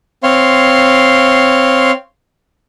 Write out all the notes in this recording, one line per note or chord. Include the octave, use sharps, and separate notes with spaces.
C4 C#5 F5 C6